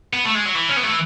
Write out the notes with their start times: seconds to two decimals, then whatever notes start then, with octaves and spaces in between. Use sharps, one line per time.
0.13 B3
0.25 A3
0.35 G#3
0.45 F#3
0.55 E3
0.69 C#4
0.77 B3
0.83 A3